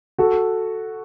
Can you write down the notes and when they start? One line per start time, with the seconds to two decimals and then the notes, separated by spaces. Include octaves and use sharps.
0.18 F#4 A4